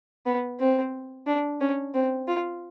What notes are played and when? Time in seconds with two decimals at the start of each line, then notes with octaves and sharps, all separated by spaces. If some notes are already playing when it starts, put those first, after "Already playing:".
0.26 B3
0.60 C4
1.27 D4
1.60 C#4
1.94 C4
2.28 F4